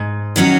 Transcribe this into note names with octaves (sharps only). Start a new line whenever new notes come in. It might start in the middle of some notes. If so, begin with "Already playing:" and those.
Already playing: G#2
D#3 F#3 C#4 F#4